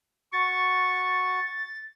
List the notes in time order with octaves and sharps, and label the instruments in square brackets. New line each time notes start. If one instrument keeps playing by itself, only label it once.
[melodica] F#4 [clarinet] C#6 [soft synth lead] A6